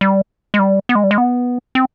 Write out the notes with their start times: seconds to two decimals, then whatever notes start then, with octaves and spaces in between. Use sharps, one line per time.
0.01 G3
0.54 G#3
0.59 G3
0.89 B3
0.95 G#3
1.04 G3
1.11 G#3
1.18 B3
1.75 C4